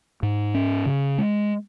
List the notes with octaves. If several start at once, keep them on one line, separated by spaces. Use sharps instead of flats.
G#2
C#4
C#3
G#3